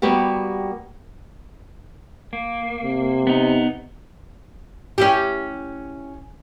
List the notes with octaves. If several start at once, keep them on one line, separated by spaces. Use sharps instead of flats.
G3 A#3 B3 F#4 G4
A#3
C3
B3 D#4
C#4 E4 G4